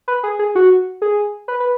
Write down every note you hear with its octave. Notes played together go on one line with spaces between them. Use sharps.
B4
G#4
G#4
F#4
G#4
B4
B4